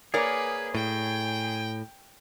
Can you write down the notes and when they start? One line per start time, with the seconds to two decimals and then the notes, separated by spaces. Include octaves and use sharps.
0.14 A#3 G#4 A#4 B4 C#5 D5
0.75 A2 G5